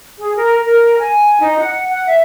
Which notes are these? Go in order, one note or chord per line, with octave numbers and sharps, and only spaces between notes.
G#4
A#4
A#4
G#5
D#4
F#5
F#5
E5